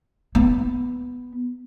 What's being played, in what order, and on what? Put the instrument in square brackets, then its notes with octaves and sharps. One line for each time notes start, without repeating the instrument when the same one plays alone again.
[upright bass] B3